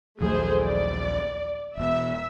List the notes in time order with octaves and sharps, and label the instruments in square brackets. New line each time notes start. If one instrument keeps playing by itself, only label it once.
[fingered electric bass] A#1 D#2 F#3 [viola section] A3 G#4 C5
[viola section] D5
[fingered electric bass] E1 B2 [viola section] E5